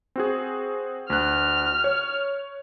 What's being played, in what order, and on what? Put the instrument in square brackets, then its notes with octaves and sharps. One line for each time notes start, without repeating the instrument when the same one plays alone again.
[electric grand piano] C4 F#4 G#4
[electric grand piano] D2 F#6 [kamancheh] F6
[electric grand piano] C#5